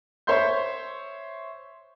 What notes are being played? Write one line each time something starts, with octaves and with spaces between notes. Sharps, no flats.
C5 C#5 E5 C6 G6